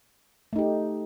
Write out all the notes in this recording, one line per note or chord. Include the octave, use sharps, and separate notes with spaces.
A3 D#4 G4